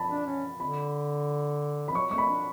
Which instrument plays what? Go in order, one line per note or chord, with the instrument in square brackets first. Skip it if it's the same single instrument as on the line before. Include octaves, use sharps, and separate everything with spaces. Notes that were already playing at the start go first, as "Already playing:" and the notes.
Already playing: [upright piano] A5 B5
[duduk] D4
C#4
[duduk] D3 [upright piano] B5
[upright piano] B5
[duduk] F#3 [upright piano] C#6
[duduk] A3 [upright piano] C#6
[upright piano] B5
[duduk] D4